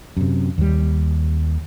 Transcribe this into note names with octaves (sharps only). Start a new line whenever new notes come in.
F#2 C3
D#2 G3